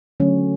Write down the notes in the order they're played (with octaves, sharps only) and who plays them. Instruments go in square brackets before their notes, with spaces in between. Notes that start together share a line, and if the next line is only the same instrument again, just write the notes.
[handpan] D3 F#3 A3 C#4